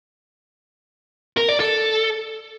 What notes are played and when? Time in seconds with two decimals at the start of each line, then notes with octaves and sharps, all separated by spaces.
1.37 A#4
1.49 D5
1.60 A4